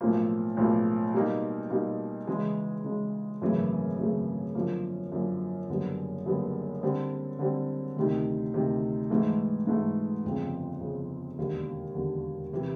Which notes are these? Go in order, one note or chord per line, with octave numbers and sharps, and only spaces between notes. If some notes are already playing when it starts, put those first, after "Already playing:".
B1 A2 F3 A#3
B1 A2 F3 A#3
B2 G3 A#3 D#4
B2 G3 A#3 D#4
C#3 E3 G#3
C#3 E3 G#3
G#1 F#2 C#3 E3 A3
G#1 F#2 C#3 E3 A3
F#2 D3 F3 A#3
F#2 D3 F3 A#3
F#1 F#2 D3 G3 B3
F#1 F#2 D3 G3 B3
D3 G3 C4
D3 G3 C4
D2 C3 D#3
D2 C3 D#3
G#2 E3 A3
G#2 E3 A3
G1 F2 C#3
G1 F2 C#3
E1 D#2 D3
E1 D#2 D3
C3 E3